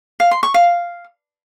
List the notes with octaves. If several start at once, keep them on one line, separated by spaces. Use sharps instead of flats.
F5
C6
C#6
F5